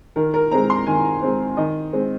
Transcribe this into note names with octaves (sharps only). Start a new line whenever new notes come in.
D#3 A#4
A#4
G#3 C4 A#5
C6
D#3 G#5
G#3 C4
D#3 D#5
G#3 C4